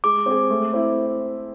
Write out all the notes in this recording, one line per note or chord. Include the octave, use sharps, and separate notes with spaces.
G#3 D6
C4 G#4
A3
C4 E4